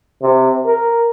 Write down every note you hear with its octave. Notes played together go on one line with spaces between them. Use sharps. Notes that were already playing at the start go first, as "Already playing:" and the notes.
C3
A#4